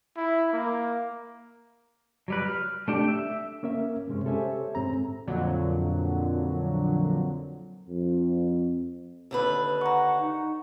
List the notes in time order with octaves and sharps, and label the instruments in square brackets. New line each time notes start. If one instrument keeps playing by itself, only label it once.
[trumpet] E4
A#3
[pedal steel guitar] F#3 G3 B4
F6
A3 D4 G4
E5
[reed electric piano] A#3 C#4 A#4 E5
G2 C3 G#3 C#4
G4 A4 C5 C#5 E5 G#5
G#2 C4 A#5
[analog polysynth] F2 A#2 D3 F#3
[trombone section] F2
[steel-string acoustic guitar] D#2 D3 B4
[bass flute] F#5 [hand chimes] A#5 C#6
[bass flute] D#4